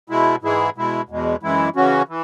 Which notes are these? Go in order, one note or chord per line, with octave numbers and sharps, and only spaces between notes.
B2 G#3 E4
G#2 E3 G#3 E4 G#4
B2 G#3 E4
E2 B2 G#3
F#2 E3 G#3 E4
C#3 E3 C#4 F#4
E3